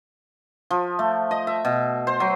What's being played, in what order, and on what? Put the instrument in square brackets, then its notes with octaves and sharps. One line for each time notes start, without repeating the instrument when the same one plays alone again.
[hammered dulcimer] F3
A3
D#5
E5
B2
C5
F#3